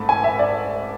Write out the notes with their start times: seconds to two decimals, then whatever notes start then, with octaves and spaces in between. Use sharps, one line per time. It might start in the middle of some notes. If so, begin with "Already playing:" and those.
Already playing: G#2 A3 A5 B5
0.09 G#5
0.24 E5
0.39 D5